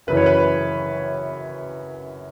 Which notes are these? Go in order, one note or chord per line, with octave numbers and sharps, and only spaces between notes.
F#1 F#2 E3 B4
C#5
B4